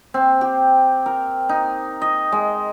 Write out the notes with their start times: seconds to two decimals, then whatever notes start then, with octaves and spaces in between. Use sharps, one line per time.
0.14 C4
0.41 G4
1.06 A#4
1.49 D#4
2.02 D#5
2.32 G#3